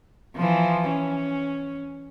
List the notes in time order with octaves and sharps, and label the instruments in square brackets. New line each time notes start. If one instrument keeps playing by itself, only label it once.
[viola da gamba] E3 F3
C#4